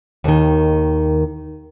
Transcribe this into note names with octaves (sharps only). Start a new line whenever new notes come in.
D#2 D#3